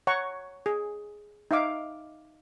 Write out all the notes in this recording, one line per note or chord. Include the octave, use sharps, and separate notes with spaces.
C#5 F#5 A#5 C#6
G#4
D#4 E5 F5 D6